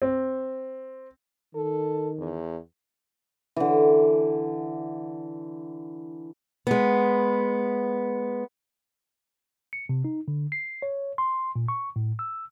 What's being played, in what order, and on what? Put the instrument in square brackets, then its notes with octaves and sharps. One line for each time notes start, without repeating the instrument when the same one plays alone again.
[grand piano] C4
[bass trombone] D#3 [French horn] A4
[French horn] E2
[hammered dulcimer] D3 E3
[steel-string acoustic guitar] G#3 B3
[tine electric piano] C#7
C3
D#4
D3
C7
C#5
C6
A#2
C#6
A2
E6